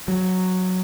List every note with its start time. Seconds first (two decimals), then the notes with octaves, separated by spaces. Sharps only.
0.08 F#3